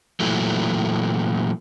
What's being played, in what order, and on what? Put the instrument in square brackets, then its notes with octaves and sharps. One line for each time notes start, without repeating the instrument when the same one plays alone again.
[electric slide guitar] A#2 E3 F#3 A3